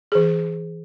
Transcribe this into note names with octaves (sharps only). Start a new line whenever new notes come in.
E3 G#4